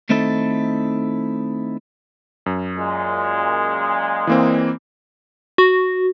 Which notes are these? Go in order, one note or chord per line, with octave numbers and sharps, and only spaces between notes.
D#3 A3 C4 D#4 E4 A4
F#2
A#2 G#3
E3 A#3 C4
F#4